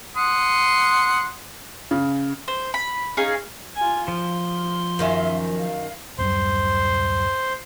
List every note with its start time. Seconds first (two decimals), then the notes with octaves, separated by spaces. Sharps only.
0.16 F#5 C6 D#6
1.91 C#3
2.48 C5
2.74 B5
3.17 C#4 D#4 G#4 F5
3.76 F4 G#5
4.08 F3 C6
4.99 F#2 D#3 C#4 E5 F5
5.59 F5
6.18 D1 F#2 G3 C5 C6